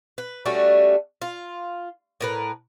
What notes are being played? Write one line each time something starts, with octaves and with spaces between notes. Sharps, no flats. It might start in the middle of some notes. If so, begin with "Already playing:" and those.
B4
G3 A3 C#4 F#4
F4
A2 A#4 B4